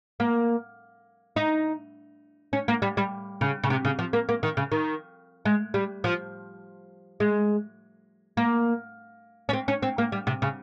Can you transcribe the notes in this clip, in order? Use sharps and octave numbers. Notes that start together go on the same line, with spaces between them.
A#3
D#4
C#4
A#3
G3
G3
C#3
C#3
C3
C#3
F3
A#3
A#3
D#3
C#3
D#3
G#3
G3
F3
G#3
A#3
C#4
C4
C#4
C4
A#3
G3
C3
C#3